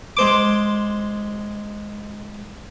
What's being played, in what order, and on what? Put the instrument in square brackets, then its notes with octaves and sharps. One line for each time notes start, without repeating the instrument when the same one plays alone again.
[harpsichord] G#3 C5 D6